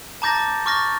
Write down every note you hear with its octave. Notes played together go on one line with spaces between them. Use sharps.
A5 A#5 D6 G6 A6 A#6
D6
C#6 D6 F6 A6 A#6